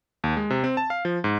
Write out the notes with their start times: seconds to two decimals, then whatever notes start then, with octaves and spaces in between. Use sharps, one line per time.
0.24 D#2
0.37 G#3
0.50 C3
0.64 C4
0.77 A5
0.90 F5
1.05 F3
1.24 G#2